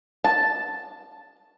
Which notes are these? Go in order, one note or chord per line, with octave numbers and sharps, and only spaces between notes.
A5